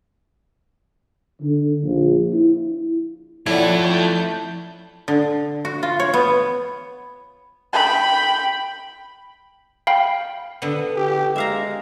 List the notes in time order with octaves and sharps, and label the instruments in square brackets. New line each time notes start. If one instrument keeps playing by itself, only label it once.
[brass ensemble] D3
A#1
E4
[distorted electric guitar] F3 A4 [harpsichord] E4 [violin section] C#5 D5 F#5
[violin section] A3 G6
[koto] D3
F#4
F4
C#5
B3
[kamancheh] G5 B5
[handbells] F5 G5 B5
[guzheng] D3 B3
[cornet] G4
[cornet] G#3 [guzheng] E5 F5 A#5